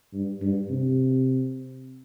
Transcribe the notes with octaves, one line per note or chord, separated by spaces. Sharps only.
G2
G2
C3